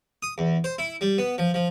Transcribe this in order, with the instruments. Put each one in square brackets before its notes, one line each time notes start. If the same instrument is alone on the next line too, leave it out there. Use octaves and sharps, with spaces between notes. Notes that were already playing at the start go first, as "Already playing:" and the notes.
[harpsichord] D#6
E2
C5
E4
G3
B3
F3
F3